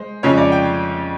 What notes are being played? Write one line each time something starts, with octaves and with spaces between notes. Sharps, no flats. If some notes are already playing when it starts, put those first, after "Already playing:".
Already playing: G#3 C5
F2 C#3 F3 G#3 C#4 C#5
D5
G5